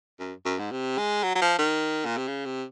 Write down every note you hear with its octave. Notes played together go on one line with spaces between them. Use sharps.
F#2
F#2
G#2
C3
G#3
F#3
F#3
F3
D#3
A#2
C3
C#3
C3